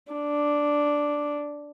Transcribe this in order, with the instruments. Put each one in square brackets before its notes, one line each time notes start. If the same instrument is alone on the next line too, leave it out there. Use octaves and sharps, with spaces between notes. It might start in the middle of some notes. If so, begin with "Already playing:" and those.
[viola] D4